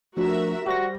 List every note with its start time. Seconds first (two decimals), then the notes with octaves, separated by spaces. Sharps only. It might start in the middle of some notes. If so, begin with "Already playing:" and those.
0.17 F3 A3 D4 F#4 A#4 E5
0.66 G3 F#4 G4 C5 A#6